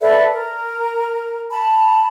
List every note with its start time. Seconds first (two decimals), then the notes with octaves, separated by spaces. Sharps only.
0.01 A4 B4 D5 E5
0.33 A#4
1.50 A5 B5